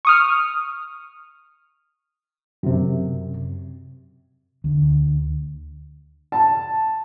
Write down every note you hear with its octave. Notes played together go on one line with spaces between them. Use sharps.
C#6 D#6 F6
F#2 C3
D2
A5